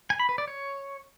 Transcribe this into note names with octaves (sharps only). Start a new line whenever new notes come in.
G#5
B5
B4
D5
C#5